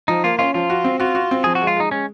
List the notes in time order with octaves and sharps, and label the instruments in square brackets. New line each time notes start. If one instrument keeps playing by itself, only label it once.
[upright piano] F3 [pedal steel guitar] D#4
[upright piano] A#3 [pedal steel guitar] F4
[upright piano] C#4 [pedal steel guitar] F4
[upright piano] F3 [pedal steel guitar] F4
[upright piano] F#4
C4
[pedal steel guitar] F4 [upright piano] F#4
[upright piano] F#4
C4
[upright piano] F3 [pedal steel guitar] G#4
[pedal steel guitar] F#4
[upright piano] G#3
[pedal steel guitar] F4
[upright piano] G#3 [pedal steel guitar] D#4
[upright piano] G#3 [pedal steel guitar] C#4